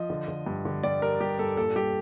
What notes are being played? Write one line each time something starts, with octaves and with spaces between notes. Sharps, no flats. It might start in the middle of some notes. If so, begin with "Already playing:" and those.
Already playing: F3 D#5
D3
D3
G2
D3
G3 D5
G3 A#4
G2 G4
G2 A4
A#2 A4
G3 G4